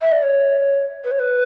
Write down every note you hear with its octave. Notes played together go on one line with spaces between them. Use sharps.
E5
D5
C#5
B4
C#5
B4